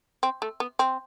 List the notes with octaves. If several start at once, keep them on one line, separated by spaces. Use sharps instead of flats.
C4
A3
B3
C4